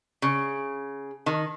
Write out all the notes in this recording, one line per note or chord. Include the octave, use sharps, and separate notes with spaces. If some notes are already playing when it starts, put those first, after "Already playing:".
C#3
D#3